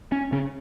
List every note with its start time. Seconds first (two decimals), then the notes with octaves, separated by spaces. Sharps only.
0.12 C#4
0.32 C#3 C#4